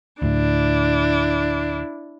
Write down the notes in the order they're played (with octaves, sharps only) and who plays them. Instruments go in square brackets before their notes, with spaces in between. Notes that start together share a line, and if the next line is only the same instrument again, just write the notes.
[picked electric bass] D2 A2 [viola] D4 E4